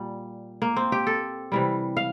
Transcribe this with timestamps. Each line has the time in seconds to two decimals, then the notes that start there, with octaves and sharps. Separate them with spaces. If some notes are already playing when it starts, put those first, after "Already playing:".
Already playing: A#2 G3
0.62 A#3
0.76 C4
0.92 G4
1.07 A4
1.52 C3 E3 G3
1.97 F5